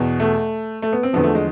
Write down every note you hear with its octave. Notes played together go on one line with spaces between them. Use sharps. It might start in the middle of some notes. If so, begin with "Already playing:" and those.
Already playing: E2 B2
A3
A3
B3
C4
E2 D3 F3 B3
A3
G#3